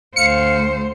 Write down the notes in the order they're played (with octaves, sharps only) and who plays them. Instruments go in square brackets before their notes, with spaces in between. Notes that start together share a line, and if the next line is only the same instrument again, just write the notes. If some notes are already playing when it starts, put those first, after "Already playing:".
[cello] D2 C5 [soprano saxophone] F5 [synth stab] C#7